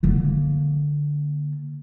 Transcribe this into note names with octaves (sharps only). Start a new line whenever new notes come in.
D3 A#3